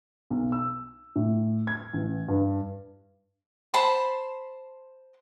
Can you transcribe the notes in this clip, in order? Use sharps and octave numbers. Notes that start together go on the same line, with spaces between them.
B1
E6
A2
G#6
A1
G2
C5 A5 B5 C6